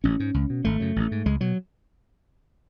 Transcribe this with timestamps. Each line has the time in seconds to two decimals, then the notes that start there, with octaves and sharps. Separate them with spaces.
0.04 A1 C#4
0.20 G#2
0.34 C#2
0.50 B2
0.65 G#1 A3
0.80 F#2 C#3
0.96 A1
1.11 G#2
1.26 C#2 G#3
1.41 B2 F#3